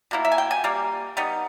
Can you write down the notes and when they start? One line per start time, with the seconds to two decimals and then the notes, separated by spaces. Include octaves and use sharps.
0.11 B2 A#3 E4
0.25 E5
0.32 G#5
0.38 G5
0.51 G#5
0.64 G3 A#3
1.17 G3 B3 D#4